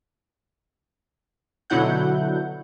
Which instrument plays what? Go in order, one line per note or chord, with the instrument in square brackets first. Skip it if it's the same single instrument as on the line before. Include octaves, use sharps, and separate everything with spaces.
[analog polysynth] B2 D3 F#3 E4 F#5 G6